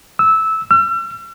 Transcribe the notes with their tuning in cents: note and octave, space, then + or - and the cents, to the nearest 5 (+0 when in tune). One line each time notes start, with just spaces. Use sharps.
E6 -15
E6 +45